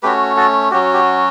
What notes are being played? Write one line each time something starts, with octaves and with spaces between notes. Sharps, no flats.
A3 C#4 F#4 G4 B4
F#4 A4
F#3 C#4 F#4 G4
G4